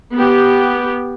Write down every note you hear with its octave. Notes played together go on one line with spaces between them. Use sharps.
B3 G4